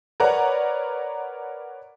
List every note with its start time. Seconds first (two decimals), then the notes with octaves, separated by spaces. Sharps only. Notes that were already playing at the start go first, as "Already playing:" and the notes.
0.20 A#4 B4 C#5 D5 F#5 A#5